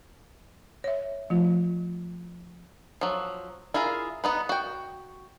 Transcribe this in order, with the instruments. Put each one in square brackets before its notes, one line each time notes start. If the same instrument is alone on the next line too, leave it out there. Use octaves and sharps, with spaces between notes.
[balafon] C#5 E5
F3 A3 F4
[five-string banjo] F3 F#3
E4 F4 G#4 A#4
B3 D#4 B4
F#4 G5